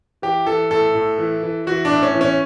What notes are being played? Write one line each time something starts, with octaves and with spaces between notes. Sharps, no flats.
E3 G4
E3 A4
A2 A4
A2
E3
E3
E3 F#4
D4
A2
C#4
E3
C#4